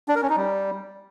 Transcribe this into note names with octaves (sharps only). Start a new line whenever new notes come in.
D4
A#4
C#4
D#4
G3